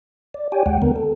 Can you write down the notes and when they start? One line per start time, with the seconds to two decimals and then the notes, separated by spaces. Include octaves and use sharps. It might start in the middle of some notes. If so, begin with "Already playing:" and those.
0.34 D5
0.52 G4 C#5 D5 G5 G#5
0.66 D#2 G#3 F#5 G5
0.82 D3 B3 A#4
0.96 A4